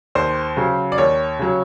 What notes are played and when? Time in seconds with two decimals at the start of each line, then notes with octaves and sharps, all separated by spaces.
0.15 D#2 C5
0.57 C#3 F#3
0.92 D5
0.98 D#2 C#5
1.39 C#3 F#3